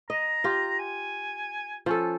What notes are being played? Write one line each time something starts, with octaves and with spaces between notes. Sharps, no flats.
D#5 A#5
F4 G4
G#5
F3 C#4 A4